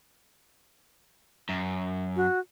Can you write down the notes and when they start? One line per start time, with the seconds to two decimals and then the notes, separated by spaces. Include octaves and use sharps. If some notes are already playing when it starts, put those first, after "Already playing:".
1.49 F#2
2.16 F#4